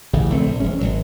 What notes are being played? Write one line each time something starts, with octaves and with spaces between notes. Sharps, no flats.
A1 D2 C#3
A#1 D3 A3 C4
A#1
E1 G#3 C#4
G#1 C#2 F#3